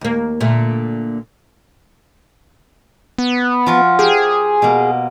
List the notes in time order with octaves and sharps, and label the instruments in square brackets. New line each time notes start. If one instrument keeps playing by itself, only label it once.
[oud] D#2 A#3
A#2 D3 A3
[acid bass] B3
[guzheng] F3 F4 F#4
[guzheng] G4 A#4 C5 [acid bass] G#4
[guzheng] B2 A#3